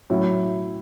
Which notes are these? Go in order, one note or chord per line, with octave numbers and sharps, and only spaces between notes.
A2 F#3 C#4 E4